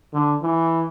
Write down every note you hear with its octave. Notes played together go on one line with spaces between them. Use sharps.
D3
E3